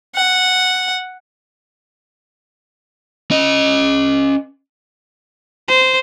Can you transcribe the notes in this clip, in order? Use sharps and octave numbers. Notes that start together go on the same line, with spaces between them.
F#5
C#4 D#5
C5